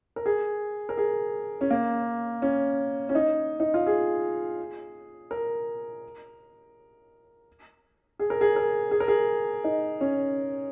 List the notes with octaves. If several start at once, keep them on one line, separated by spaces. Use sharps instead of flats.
A#4
G#4
A#4
G#4
C#4
A#3
C#4
C#4
D#4
D#4
F4
G#4
A#4
G#4
A#4
G#4
A#4
G#4
A#4
G#4
D#4
C#4